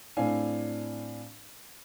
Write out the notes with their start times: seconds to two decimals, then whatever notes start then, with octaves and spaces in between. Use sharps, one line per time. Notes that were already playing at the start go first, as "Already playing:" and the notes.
0.17 A2 C4 D4 F5 G#5